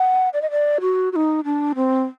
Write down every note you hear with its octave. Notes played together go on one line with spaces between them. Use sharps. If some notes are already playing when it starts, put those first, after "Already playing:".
Already playing: F#5
D5
D#5
D5
F#4
F#4
D#4
D4
C4